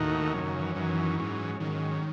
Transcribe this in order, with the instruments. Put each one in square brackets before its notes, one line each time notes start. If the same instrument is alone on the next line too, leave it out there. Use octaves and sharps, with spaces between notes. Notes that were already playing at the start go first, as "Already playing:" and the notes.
Already playing: [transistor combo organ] D#2 D#3 A3 D#4 F#4 [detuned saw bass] A2
[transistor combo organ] F#2 D#3 F#3 C#4 [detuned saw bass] C3
[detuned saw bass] C#3
E3
[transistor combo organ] F#2 D#3 F#3 C#4
G#2 F#3 C#4
[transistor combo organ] G#2 F#3 C#4 [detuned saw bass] D#3